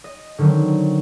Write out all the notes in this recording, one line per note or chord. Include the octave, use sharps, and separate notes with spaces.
D#5
D3 D#3 F#3 C4 C#4